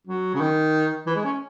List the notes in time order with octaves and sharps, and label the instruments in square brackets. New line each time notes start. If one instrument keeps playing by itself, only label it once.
[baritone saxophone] F#3
C#3
D#3
E3
G#3
C#4